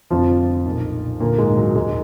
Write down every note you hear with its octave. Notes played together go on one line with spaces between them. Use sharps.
F1 F2 D3 F3 F4
B1 A#2
D2 A#2 D3 A#3
G#2 G#3
F#3
D#2 G#2 D#3 G#3